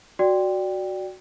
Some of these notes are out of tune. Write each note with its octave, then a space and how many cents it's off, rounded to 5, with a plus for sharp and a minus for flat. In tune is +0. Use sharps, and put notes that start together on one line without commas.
F#4 +0 D5 +0 G5 +0